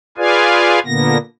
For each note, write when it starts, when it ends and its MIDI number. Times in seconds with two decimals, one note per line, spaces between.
0.18 0.79 65
0.18 0.79 68
0.18 0.79 71
0.18 0.79 74
0.18 0.79 77
0.18 0.79 80
0.86 1.18 46
0.86 1.18 50
0.86 1.18 58
0.86 1.18 59
0.86 1.18 94